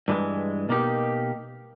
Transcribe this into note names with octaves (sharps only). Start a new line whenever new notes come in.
G2 E3 G#3
B2 A#3 D#4 G4